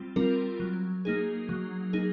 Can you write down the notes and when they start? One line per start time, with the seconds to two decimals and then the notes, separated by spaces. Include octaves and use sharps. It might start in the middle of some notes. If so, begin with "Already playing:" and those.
Already playing: G3 C4 F4
0.16 G3 C4 F4 A#4
0.60 F#3
1.05 A#3 D#4 G#4
1.49 F#3
1.93 A#3 D#4 G#4